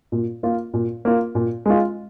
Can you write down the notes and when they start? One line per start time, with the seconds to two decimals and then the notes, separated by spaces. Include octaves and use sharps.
0.12 A#2
0.43 A#3 F4
0.74 A#2
1.05 A#3 F4
1.35 A#2
1.66 G#3 F4